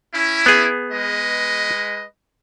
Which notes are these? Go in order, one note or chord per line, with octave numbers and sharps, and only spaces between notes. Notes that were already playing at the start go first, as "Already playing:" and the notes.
C#4 E4
B3 G#4
G#3 B4 D#5